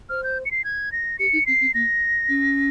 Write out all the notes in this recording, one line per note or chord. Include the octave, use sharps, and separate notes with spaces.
C5 F6
G6
C#7
C7
G#6
A#6
G4 C#7
D#4
C4 C7
C4
A#3 A#6
C#4